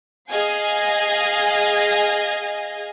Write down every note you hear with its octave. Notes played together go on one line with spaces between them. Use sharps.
G#4 D#5 F5 G#5